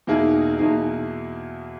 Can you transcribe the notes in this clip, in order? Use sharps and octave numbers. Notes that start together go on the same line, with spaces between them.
E2 B2 A#3 D#4 E4 G#4
E2 B2 A#3 D#4 E4 G#4